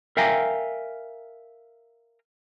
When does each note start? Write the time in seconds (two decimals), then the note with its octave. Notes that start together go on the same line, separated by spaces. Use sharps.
0.17 A#4 E5 F5 G5 G#5 A#5